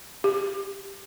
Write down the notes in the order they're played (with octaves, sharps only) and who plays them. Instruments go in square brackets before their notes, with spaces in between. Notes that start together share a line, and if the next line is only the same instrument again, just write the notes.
[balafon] G4